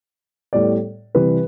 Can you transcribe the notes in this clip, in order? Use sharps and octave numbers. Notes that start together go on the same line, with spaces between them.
A2 G3 B3 D5
C3 E3 G3 B4